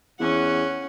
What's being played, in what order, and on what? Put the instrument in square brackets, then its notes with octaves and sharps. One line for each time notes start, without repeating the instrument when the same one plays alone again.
[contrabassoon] E2 [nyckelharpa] C#4 F#5